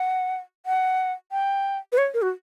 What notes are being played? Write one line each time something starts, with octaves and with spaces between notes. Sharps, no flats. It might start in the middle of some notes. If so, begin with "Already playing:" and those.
Already playing: F#5
F#5
G5
B4
C#5
A#4
F#4